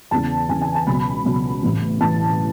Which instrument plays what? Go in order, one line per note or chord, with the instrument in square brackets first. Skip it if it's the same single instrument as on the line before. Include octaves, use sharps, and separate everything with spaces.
[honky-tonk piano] E2 C#3 E3 A5
E2 C#3 E3 G#5
G#5
A5
C#2 B2 F#3 B5
C#2 B2 F#3
A1 A2 E3
A1 A2 E3 A5